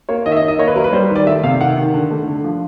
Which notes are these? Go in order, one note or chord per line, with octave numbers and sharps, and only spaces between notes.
A#3 C#5
D#3 D#5
E5
D#5
D#3
D#5
A#3 C#5
B4
F#3 A#4
B4
G3 C5
D#3
D5
A3 E5
C3 F5
D#3 F#5
D#3
D3
A3
D3
F3